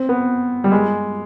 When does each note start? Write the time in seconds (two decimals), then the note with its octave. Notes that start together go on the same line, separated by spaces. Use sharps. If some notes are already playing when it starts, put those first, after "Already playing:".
Already playing: C4
0.09 B3
0.64 G3
0.72 G#3